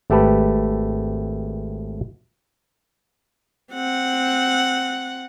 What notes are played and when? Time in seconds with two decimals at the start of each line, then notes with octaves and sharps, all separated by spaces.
0.10 G#1 A3 G4 A4 B4
3.73 C4 F#5